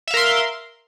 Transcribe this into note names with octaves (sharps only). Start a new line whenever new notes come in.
A#4 E5 F5 C6